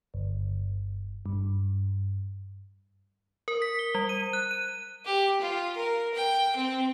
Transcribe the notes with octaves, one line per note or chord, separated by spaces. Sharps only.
G1
G2
A#4
B6
G7
G3
D#7
F#6
D#7
G4
F4
A#4
G5
C4